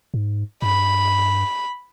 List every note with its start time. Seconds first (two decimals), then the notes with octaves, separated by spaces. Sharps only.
0.14 G#2
0.62 G2 B5